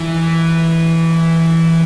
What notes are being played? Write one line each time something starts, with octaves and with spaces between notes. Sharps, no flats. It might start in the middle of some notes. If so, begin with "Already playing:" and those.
Already playing: E3